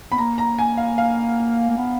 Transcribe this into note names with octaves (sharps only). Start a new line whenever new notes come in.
B3 B5
A#3 A#5
A#5
G#5
F5
F5
A#3
B3